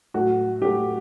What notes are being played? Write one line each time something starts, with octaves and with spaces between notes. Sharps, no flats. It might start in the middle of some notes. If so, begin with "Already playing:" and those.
A2 F#3 A3 F#4
A2 F#3 A3 G4